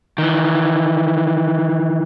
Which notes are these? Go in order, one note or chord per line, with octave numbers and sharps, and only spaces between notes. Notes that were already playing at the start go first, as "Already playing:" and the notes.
D#3 E3